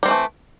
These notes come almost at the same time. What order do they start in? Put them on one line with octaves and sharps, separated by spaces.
G3 C4 E3 A3